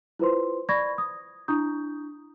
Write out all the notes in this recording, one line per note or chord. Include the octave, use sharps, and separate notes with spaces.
E4 F4 B4 C5 C6
D5 B5 C#6 G#6 A#6
D#6
D4 E4 A#5 C#6 D#6 G6